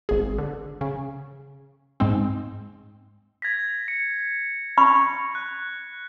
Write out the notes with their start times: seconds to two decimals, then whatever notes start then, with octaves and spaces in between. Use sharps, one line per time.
0.09 G#1 G#4
0.38 D3
0.81 C#3
2.00 G#2 G#3 C4
3.42 G#6 A#6 B6
3.88 C#7
4.78 B5 C#6
5.35 F#6